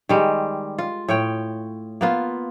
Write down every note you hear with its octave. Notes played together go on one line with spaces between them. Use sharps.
D#3 G3 G#3
F4
A2 C#5 G5
A#3 B3 F4